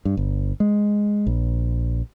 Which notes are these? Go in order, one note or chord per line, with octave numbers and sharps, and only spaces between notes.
G2
G1
G#3
A#1